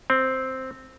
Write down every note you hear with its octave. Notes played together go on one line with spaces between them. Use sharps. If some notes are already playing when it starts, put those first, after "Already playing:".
C4